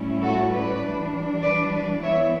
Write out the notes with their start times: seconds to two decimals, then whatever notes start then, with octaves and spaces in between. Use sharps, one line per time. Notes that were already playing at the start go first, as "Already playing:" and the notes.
Already playing: A2 G3 C#4 E4
0.22 F#4 A4
0.52 B4 D5
0.83 E3 G3 D4
1.43 B4 D5
1.73 B4 D5
2.03 E3 B3 E4 C#5 E5